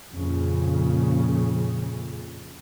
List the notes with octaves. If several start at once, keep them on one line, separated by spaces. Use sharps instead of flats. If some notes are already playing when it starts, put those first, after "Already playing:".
F2 A#2 C#3